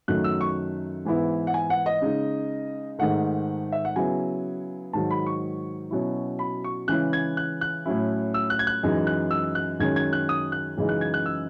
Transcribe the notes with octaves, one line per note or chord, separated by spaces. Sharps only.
F#2 D#3 F#3 A3 F#6
E6
C#6
G#2 E3 B3 E4
F#5
G#5
F#5
D#5
C#3 G#3 D#4
G#2 D#3 A3 F#5
E5
F#5
C#3 F#3 B3 E4 G#5
G#2 D#3 F#3 A5
B5
C#6
B2 F#3 C#4 E4
B5
C#6
C#3 E3 G#3 C#4 E4 F#6
G#6
F#6
F#6
A2 F#3 C#4 E4
E6
F#6
G#6
F#6
F#2 E3 G#3 D#4
F#6
E6
F#6
F#2 D#3 G#3 C#4 G#6
G#6
F#6
D#6
F#6
F#2 C#3 E3 G#3 D#4
F#6
G#6
F#6
E6